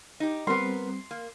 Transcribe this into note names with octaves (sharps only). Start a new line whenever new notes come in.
D#4 G4
G3 B3 C4 A#4 C6
A#3